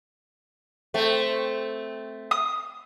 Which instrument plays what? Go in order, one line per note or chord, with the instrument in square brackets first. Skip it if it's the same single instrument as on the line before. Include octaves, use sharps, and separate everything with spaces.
[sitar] A3 C4
[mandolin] D#6